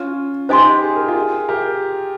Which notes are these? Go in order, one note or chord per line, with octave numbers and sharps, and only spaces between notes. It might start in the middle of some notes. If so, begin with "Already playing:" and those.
Already playing: C#4 F4
D#4 G4 C5 D#5 G#5 C6
G#4
A#4
F4 G#4
G4 A#4